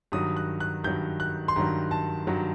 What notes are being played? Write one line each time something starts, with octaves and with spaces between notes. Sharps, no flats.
G2 D#3 F#3 D#6
F#6
F#6
G2 D#3 F#3 G6
F#6
C6
G2 D#3 F#3 A#5
A5
G2 D#3 F#3